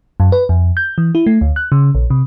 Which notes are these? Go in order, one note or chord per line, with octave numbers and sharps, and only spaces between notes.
F#2
B4
F2
G6
E3
E4
A3
D2
F#6
C#3
A#1
C3